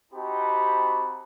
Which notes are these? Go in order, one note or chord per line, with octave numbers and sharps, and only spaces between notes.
C4 D#4 F#4 G4 A5 B5